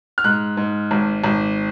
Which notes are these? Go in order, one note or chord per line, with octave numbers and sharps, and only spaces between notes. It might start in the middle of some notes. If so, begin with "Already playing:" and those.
F6
G#2 F#6
G#2
G#1
G#1